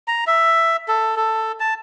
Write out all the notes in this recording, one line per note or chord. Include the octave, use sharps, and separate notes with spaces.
A#5
E5
A4
A4
A5